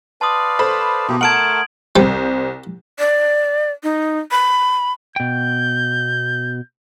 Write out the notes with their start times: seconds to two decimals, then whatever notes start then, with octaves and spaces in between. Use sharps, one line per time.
0.21 B4 D5 F5 A5 C6 D#6
0.59 A4 C5 B5
1.09 B2 A#3 E4 G4
1.21 A3 A#4 F#5 A5 G#6 D7 F#7
1.96 C2 G3 C5
2.99 D5
3.83 D#4
4.31 B5
5.16 B2 G5 G6